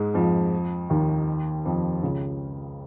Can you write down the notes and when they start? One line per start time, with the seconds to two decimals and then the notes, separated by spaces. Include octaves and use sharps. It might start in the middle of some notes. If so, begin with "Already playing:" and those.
Already playing: G#2 G#3
0.14 F2 F3
0.90 D#2 D#3
1.65 F2 F3
2.03 C#2 C#3